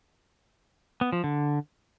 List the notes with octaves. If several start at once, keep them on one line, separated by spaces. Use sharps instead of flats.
B3
F3
D3